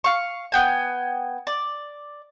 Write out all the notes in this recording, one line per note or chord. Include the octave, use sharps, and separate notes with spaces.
F5 C#6
B3 G5 G#5
D5